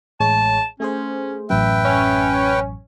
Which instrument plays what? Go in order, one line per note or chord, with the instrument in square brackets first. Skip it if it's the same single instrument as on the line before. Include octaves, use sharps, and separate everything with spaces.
[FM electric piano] A1 G#3 C#5 [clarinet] A5
[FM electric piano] A3 G#4 C5 [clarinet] C#4
[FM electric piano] A1 F#2 [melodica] B4 G5 [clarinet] E5
[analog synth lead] C#4